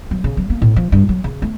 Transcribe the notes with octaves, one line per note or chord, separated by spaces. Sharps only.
F#3
C#3
F#3
A#3
A2
F3
G2
F#3
C#3
A3